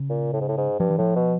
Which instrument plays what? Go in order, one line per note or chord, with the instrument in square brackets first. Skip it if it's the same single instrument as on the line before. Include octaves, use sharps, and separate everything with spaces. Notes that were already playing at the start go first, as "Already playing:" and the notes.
Already playing: [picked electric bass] C#3
[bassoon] A#2
A2
G#2
A2
G#2
[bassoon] G2 [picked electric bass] F3
[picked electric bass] E3
[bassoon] A2 [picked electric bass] F3
[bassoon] B2